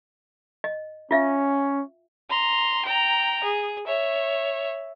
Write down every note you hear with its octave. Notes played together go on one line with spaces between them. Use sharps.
D#5
C#4 F4 E5 F5
A#5 C6
G5 A#5
G#4
C#5 E5